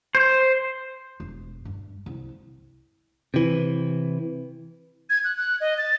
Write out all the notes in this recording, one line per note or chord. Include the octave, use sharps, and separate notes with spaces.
C5
E1
G2
C2
C3 E3
G#6
F#6
F#6
D#5
A6